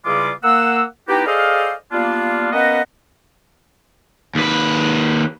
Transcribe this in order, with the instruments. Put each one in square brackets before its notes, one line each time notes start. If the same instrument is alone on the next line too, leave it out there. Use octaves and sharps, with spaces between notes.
[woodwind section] E2 C#3 G3 G#3 F4 D6
A#3 F#5 E6
B3 D#4 E4 F#4 G4
G#4 A4 C5 D5 D#5 F5
G3 A#3 B3 D4 F4
A#3 B3 C#4 F#4 B4 D#5
[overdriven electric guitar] D#2 B4